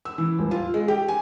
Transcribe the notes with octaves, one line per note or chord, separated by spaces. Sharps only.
E6
E3
D#1
F4
G#3
G4
G#5